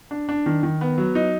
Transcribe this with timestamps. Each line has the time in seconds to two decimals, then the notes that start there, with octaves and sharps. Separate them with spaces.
0.11 D4
0.29 D4
0.46 D#3
0.63 D#3
0.81 B3
0.98 F#3
1.15 D#4